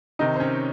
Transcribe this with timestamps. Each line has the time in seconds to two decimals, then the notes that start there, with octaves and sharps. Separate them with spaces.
0.19 C3 D#3 D#4 D#5
0.36 C5
0.40 C#4 C#5